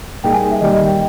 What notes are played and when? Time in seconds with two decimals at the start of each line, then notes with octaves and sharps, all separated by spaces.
0.23 A#2 G3 A#3 D#4 G#4 G5
0.33 G#5
0.51 E5
0.61 D#3 G3 A#3 D#5
0.73 D#5
0.85 G5